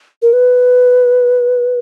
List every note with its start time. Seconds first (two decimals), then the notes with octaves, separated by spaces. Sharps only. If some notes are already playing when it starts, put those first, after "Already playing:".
0.22 A#4
0.33 B4